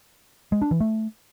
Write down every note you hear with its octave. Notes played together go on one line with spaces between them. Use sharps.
G#3
D4
E3
A3